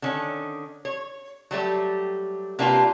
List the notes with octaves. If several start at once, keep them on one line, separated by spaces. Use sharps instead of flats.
D3 D#3 C#4
C#5
F#3 G3 A3 G4
C3 A#3 D4 F4 G4 B4